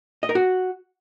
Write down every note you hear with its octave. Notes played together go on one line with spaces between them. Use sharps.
D#5
A#4
F#4